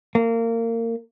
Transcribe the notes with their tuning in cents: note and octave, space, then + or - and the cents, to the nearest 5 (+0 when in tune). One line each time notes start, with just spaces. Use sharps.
A#3 -25